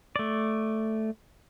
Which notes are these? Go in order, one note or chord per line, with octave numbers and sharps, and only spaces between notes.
A3 D5